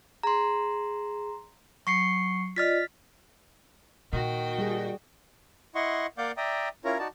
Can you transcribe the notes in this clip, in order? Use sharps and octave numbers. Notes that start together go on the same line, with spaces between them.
G#4 A#5 C6
F#3 C#6 C7 C#7
F4 D5 D#5 F6 A6 B6
A#2 D#3 F#4 G5
G3 G#4
E4 D#5 F#5 C6 C#6
A#3 D5 F5 F#5 D6 G6
D5 E5 G5 A#5 D#6
C#4 E4 F4 A#4 C#5 A#5
D#4 F#4 D5 A5